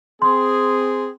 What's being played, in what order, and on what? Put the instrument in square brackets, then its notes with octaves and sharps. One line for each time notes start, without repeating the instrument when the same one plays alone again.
[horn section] C4 G#4 [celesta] C6